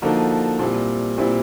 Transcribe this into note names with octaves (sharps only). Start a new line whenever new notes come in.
D3 F3 A#3 D#4 F#4
A#2 G3 C4 E4
A#2 G3 C4 E4